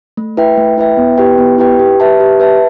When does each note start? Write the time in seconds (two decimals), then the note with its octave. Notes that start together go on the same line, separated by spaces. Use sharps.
0.17 A3
0.37 E4 B4 E5 G5
0.57 A3
0.78 E4 B4 E5 G5
0.97 B3
1.18 E4 G4 B4 G5
1.38 B3
1.58 E4 G4 B4 G5
1.79 G4
2.00 B4 E5 A5
2.20 G4
2.40 B4 E5 A5